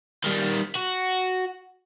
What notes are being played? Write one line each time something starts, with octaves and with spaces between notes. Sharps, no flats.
D#3 G3
F#4